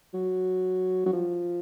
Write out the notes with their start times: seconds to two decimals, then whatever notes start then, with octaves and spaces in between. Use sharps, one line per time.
0.14 F#3
1.06 F#3
1.13 F3